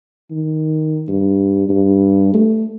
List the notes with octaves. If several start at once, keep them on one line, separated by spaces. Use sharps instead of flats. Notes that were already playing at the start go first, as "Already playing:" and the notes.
D#3
G2
G2
A3